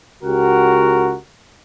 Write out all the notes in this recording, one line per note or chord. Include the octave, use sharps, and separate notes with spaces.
C#2 F#4 G4 A#4 F#5